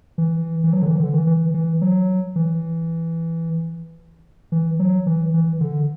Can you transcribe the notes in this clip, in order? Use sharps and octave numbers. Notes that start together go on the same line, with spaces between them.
E3
E3
F#3
D3
E3
D3
E3
E3
E3
F#3
E3
E3
F#3
E3
E3
D3